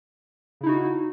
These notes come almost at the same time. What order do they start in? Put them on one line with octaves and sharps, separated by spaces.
C#3 E4 D#4 F#4